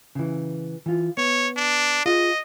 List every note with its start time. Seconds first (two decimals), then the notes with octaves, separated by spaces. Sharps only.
0.15 C#3 E3
0.86 E3 F4
1.17 B3 C#5
1.56 D4
2.06 F4 G#4 D#5 F5